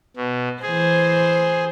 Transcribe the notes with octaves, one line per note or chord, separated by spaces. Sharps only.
B2
E3 G#4 C5